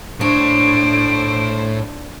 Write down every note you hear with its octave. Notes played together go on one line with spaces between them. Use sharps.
A2 D4 C5 C#5 D7